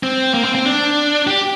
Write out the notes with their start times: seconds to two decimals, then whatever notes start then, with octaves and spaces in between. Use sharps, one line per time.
0.03 C4
0.34 A#3
0.45 C4
0.55 C4
0.65 D4
1.27 G4